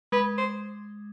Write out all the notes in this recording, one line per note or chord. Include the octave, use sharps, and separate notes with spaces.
G#3 B4
C5